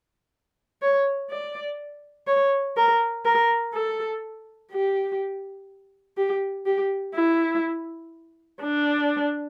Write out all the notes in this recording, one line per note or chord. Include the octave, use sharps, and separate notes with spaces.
C#5
D5
C#5
A#4
A#4
A4
G4
G4
G4
E4
D4